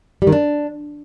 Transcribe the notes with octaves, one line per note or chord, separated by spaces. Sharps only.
G3
D#3
D4